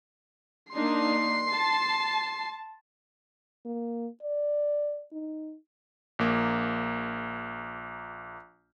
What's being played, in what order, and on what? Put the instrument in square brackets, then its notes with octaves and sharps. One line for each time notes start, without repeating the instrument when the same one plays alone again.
[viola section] A#3 D4 D#4 [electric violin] C6 C7
[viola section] A5
[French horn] A#3
D5
D#4
[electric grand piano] A#1 A#3